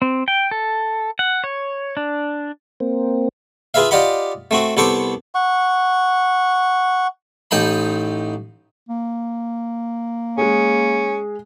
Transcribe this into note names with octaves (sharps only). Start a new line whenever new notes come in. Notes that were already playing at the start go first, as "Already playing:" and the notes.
C4
G5
A4
F#5
C#5
D4
A#3 C4
F4 G#4 B4 E5 F5
F4 G4 D5 D#5 F#5 B5
A3 C4 F#4
C2 B3 A4 C5 C#6 D6
F#5 C#6
A1 D#4 G5 A5 B5
A#3
G#3 C#4 G#4